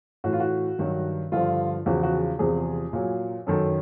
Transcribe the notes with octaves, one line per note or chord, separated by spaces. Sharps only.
A2 E3 F#4
F4
F#4
G2 D#3 F#3
G2 D3 F3 F4
E2 C#3 F3 F#4
F#4
E2 C3 F3 G#4
A#2 F#3
F#2 D#3 F#3 A4